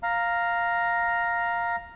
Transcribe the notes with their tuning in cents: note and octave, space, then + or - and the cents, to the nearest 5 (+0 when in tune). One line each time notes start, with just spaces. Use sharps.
F5 +0 A#5 +0